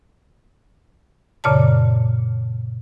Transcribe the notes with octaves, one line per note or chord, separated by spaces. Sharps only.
F#2 A#2 C#3 C#5 D5 A5